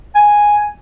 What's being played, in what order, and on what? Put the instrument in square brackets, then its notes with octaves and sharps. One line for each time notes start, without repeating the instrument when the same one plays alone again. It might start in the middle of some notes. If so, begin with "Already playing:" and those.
[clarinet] G#5